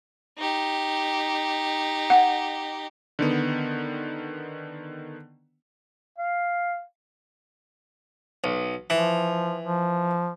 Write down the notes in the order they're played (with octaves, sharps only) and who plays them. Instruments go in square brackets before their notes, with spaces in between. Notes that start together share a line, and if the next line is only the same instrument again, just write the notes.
[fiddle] D#4 G4
[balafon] F#5
[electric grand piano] D3 D#3 B3
[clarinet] F5
[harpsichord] B1
[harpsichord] E3 [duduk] F3
[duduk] F3